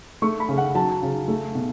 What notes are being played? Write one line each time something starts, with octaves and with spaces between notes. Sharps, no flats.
A3 C#6
B5
C#3
F#5
F#3 A5
C#3
A3
B2